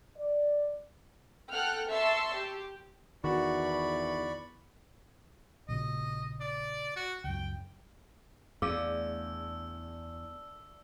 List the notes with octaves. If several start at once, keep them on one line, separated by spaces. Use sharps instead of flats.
D5
A4 F#5 G5 F6 F#6
E5 A5 C6 C#6 E6
G4
E2 D#3 F#4 D5 B5 C#6
A#1 A#2 C#3 D#5
D5
F#4
C#2 F#2 G5
E2 D3 A3 D4 G#4 F5 E6